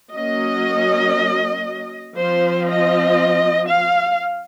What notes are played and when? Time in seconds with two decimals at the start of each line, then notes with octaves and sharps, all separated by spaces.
0.14 F#3 A#3 C#4 D#5
2.17 F3 C4 C5
2.68 D#5
3.69 F5